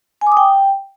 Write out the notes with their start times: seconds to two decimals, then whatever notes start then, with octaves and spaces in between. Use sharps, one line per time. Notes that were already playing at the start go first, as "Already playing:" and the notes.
0.21 G#5
0.27 D6
0.32 D#6
0.37 G5